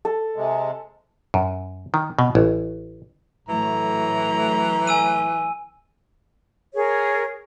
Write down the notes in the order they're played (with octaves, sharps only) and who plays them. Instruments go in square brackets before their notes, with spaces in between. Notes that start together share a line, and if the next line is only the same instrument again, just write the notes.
[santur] A4
[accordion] C3 G#3
[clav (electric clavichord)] F#2
D#3
B2
A1
[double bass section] A2 F#3 A3 [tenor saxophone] E3 [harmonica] A#5
[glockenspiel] G#5 E6 D#7
[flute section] G#4 A#4 C#5